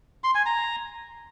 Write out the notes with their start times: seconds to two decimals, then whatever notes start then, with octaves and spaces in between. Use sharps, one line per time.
0.24 C6
0.35 G#5
0.46 A#5